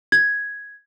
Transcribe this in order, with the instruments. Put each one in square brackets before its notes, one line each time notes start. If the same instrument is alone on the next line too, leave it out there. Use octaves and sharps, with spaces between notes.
[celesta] G#6